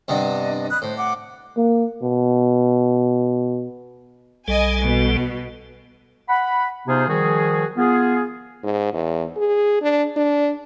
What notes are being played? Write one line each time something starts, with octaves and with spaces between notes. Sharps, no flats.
G2 C3 B3 D4 D#5
B5 D#6 F#6
A2 C5
F#5 D6
A#3
B2
B1 G3 A4 D#5 G#5
B2
F#5 B5
C3 B3 D#4 F4 G#4 C5
D#3 F3 G3 F#4 G#4
B3 F4 G#4
G#2
E2
G#4
D4
D4